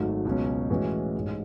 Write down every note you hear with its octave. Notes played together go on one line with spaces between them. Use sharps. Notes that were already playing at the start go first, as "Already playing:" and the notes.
Already playing: G#1 G#2 F#3 A3
C#2 B2 F#3 C#4
A2 E3 G#3 C#4 F#4
A1 G#2 G#3